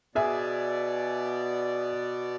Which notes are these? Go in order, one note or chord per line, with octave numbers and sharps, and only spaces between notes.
B2 B3 G#4 D5 E5 G#5